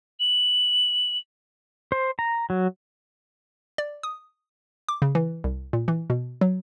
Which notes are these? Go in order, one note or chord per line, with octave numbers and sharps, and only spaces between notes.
F#7
C5
A#5
F#3
D5
D#6
D6
C#3
E3
C2
A#2
E3
B2
F#3